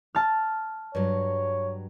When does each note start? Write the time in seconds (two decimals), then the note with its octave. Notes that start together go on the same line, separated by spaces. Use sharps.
0.15 A5 F6
0.95 G2 F#3 C#5